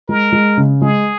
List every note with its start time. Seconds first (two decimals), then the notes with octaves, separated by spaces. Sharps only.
0.09 G#3 A#4
0.32 G#3
0.57 C#3
0.82 G#3 G#4